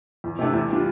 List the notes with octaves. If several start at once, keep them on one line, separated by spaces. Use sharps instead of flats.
E2
C3 E3 A3 D4
E2
E3 G3 D4 F4